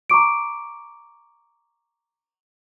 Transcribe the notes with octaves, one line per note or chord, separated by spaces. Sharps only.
A#5 C#6 D6 D7